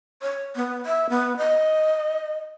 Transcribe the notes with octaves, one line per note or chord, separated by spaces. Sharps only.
C#5
B3
E5
B3
D#5